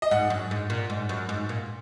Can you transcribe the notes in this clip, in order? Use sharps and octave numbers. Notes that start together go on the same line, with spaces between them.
D#5
G#2 F#5
F#2
G#2
A#2
G#2
F#2
G#2
A#2